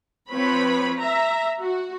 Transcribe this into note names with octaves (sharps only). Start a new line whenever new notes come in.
F3 C4 B4 C#5 B5
E5 A#5
F#4